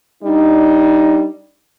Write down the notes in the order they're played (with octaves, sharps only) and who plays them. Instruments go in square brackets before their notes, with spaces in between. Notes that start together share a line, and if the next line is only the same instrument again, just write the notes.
[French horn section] G3 D4 D#4